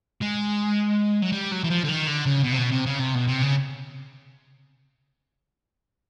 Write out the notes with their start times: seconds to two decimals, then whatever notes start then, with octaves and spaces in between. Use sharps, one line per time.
0.21 G#3
1.22 F#3
1.32 G3
1.52 F#3
1.64 E3
1.70 F3
1.84 D3
1.89 D#3
2.07 D3
2.26 C#3
2.44 B2
2.53 C3
2.58 B2
2.72 C3
2.86 C#3
3.00 C3
3.15 B2
3.27 C3
3.42 C#3